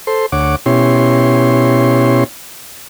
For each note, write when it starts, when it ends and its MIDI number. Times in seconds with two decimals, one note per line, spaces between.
0.07 0.26 69
0.07 0.26 72
0.07 0.26 84
0.32 0.56 38
0.32 0.56 73
0.32 0.56 78
0.32 0.56 86
0.66 2.24 47
0.66 2.24 61
0.66 2.24 64
0.66 2.24 67
0.66 2.24 73
0.66 2.24 84